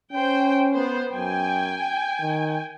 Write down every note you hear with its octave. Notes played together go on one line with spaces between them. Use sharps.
C#4 C5 G5
B3 C5
F#2 G5 G#5
D#3